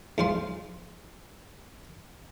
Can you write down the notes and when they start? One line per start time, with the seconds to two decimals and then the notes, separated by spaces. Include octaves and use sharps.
0.18 G#2 F3 C6